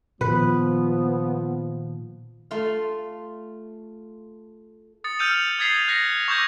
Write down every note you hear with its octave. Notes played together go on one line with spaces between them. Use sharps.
A#2 D#3 F3 B3 B4
A3 F4 F5
D#6 A6 C#7
E6 F6 G6 C#7 D#7 F7
D#6 G#6 A6 B6 C7 F7
F#6 A#6 B6 C#7
C#6 D6 E6 G6 G#6 A#6